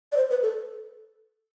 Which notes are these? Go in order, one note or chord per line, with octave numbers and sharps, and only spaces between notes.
D5
C5
B4
A4